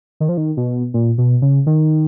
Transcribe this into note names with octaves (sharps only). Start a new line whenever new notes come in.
D#3
F3
D#3
B2
A#2
B2
C#3
D#3